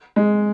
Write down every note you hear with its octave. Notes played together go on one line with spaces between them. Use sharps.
G#3